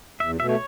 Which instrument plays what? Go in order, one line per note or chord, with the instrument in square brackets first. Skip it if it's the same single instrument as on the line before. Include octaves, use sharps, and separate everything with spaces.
[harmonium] E2 [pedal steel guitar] E5
[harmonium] B2 [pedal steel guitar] E5
[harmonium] A3 [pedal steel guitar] C#5